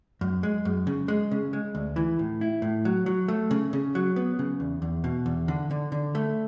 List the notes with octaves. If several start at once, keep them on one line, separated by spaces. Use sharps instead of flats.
F#2
G#3
F#2
C#3
G#3
C#3
G#3
D2
E3
A2
E4
A2
F#3
F#3
A3
C#3
C#3
F#3
B3
C#3
E2
E2
B2
E2
D3
D3
D3
A3